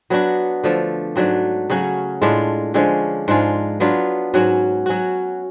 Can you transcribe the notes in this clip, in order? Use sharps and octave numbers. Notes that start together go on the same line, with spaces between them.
F#3 B3 D4 F#4
D3 F3 A3
G#2 F#3 A3 D4
C#3 F#3 C#4 F#4
A2 G#3 D4 F4
D3 F3 G#3 C#4
G#2 G#3 D4 F4
F#3 B3 D4 F4
G#2 F#3 C#4 F#4
F#3 C#4 F#4